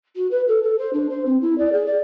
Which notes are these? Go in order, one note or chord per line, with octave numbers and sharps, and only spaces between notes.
F#4
B4
A4
A4
C5
D4
C5
C4
E4
D5
G#4
D5